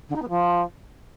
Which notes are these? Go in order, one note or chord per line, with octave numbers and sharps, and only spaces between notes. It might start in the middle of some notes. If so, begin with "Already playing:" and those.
D3
D#4
B3
F3